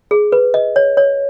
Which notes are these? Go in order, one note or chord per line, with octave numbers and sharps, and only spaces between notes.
G#4
B4
D#5
C#5
C#5